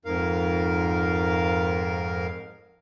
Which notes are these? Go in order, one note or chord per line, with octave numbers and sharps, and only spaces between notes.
F2 G#2 A#4 F5